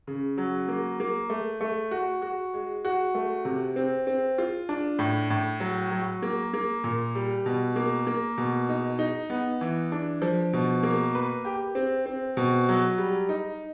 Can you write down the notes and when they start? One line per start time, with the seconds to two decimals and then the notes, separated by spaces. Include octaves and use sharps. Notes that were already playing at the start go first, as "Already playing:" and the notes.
0.07 C#3
0.38 F#3
0.68 A#3
1.00 A#3
1.30 A3
1.61 A3
1.91 F#4
2.22 F#4
2.54 G#3
2.85 F#4
3.15 A3
3.45 C3
3.76 C4
4.07 C4
4.38 F4
4.69 D4
4.99 A2
5.30 A2
5.60 F#3
5.91 F#3
6.22 A#3
6.54 A#3
6.84 A#2
7.15 G3
7.46 B2
7.76 A#3
8.07 A#3
8.38 B2
8.69 D#4
8.99 D#4
9.30 B3
9.61 E3
9.92 D4
10.22 F3
10.53 B2
10.83 A#3
11.15 B4
11.45 G4
11.75 C4
12.06 C4
12.37 B2
12.69 F#3
12.98 G3
13.29 D#4